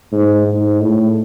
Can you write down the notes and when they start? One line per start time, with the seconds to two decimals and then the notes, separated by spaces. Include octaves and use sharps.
0.12 G#2
0.47 G#2
0.82 A2